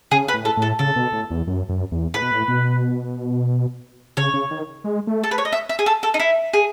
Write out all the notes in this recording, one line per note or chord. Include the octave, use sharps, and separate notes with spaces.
C#3 G#4
B4
A2
A4
A2
A4
C#3 A4
B2
A2
E2
F#2
F#2
E2
A2 B4
B2
A2
B2
C#3 C#5
C#3
D#3
G#3
A3
A4
B4
C#5
D#5
E5
E5
G#4
A4
A4
D#4
E4
G#4